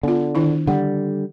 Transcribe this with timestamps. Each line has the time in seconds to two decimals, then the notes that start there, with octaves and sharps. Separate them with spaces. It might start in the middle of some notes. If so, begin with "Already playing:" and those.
0.03 D3 B3 F4
0.35 D#3 D4 E4
0.67 D3 G3 F#5